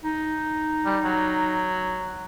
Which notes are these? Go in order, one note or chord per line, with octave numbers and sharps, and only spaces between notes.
D#4
G3
F#3